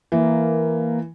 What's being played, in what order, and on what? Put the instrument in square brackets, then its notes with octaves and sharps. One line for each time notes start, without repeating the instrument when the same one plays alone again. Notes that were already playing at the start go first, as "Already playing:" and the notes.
[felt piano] E3 [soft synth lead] A#3